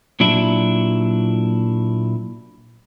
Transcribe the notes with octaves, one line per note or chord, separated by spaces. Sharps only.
A#2 F#3 D4 E4